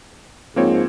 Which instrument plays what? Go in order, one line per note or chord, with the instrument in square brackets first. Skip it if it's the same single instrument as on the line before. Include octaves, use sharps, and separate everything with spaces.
[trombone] G#2 [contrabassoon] F3 [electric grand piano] A#3 C4 C#5